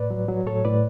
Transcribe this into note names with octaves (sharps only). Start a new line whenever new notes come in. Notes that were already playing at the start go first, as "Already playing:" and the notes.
Already playing: A2 B4 D5
F#3
F#3
A2 A4 C#5
A2 B4 D5